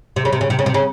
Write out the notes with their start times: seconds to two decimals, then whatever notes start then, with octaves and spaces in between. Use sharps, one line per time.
0.16 C3
0.25 C#3
0.33 C3
0.41 C#3
0.50 C3
0.59 C#3
0.66 C3
0.74 C#3